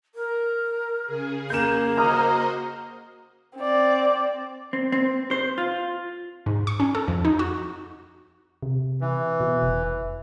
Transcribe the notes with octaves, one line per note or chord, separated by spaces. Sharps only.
A#4
C#3 G#4
A#3 G6 E7
F#4 C5 D#5 A#5 D#6 F6
C4 D5
C4
C4
C5
F4
G#2
C#6
C#4
A4
F2
D#4
F#4
C3
E3
B2
F1